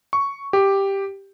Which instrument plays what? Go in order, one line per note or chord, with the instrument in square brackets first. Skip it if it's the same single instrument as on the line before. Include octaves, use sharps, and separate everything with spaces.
[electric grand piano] C#6
G4